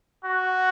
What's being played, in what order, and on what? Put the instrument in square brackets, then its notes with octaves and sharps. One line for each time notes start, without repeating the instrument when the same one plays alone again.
[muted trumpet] F#4